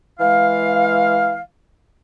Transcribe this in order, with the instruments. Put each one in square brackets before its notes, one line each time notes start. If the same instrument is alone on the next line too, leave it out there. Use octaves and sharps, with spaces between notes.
[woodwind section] E3 G#3 F5